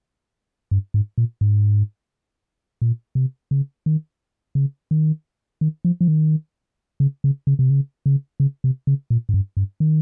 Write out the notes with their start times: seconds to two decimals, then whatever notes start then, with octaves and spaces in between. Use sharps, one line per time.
0.71 G2
0.94 G#2
1.18 A#2
1.41 G#2
2.82 A#2
3.15 C3
3.51 C#3
3.86 D#3
4.55 C#3
4.91 D#3
5.61 D#3
5.85 F3
6.01 F3
6.08 D#3
7.00 C#3
7.24 C#3
7.47 C#3
7.59 C3
7.70 C#3
8.06 C#3
8.40 C#3
8.64 C3
8.87 C#3
9.10 A#2
9.29 G#2
9.34 G2
9.57 G2
9.80 D#3